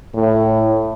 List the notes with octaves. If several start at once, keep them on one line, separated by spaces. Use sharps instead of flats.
A2